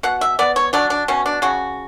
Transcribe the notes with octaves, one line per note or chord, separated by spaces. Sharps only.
B2 F#5
E5
B3 D5
C#5
F#3 D4
D4
B2 C#4
D4
C#3 F#4